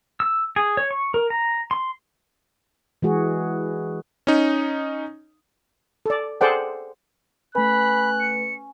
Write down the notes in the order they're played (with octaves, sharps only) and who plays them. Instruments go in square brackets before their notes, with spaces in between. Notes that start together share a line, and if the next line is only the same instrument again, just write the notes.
[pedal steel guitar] E6
G#4
C#5
C#6
A#4
A#5
C6
[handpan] E3 G#3 F#4 G#4
[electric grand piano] C#4 D#4
[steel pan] A4 D5
G#4 A4 C5 D5 F#5 G5
[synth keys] A3 B4 [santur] C#4 [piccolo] B5 [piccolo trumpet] F#6
[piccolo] C#7